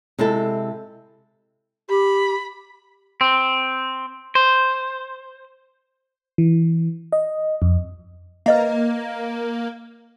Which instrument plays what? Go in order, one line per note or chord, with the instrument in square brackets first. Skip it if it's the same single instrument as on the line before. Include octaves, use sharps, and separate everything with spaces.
[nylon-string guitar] C3 G#3 E4 A4
[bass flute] G4 [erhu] B5
[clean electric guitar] C4
C5
[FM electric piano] E3
D#5
F2
[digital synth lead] A#3 [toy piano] B4 D#5 F5